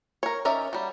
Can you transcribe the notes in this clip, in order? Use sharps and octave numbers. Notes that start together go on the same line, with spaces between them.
A#4 C#5
D#3 C#4 A#4 D5 E5
F#3 G3